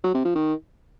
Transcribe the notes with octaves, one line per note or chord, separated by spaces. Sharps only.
F#3
C3
F3
D#3